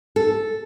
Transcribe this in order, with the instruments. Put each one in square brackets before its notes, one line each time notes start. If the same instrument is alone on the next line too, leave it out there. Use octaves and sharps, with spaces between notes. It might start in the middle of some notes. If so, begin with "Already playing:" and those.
[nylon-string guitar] A4